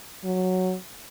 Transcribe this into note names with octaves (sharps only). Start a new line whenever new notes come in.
F#3